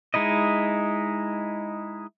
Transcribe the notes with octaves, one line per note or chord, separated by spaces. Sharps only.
G#3 D#4 E4 D#5